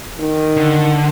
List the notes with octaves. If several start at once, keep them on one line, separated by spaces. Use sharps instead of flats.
D#3
D3